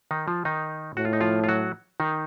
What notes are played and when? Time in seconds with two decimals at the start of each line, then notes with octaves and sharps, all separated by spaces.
0.11 D#3 D#4
0.28 F3 F4
0.45 D#3 D#4
0.97 A2 F#4
1.05 F4
1.13 D#4
1.21 F3 F4
1.44 F4
1.48 F#3 F#4
2.00 D#3 D#4